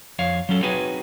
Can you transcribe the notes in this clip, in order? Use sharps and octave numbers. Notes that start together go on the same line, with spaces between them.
F2 C#5 F5
F#3 C#4 A4
C4 D#4 F#4 G#4 B4 C#5